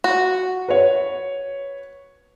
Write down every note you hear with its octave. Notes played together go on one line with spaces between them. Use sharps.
F#4
B4 C#5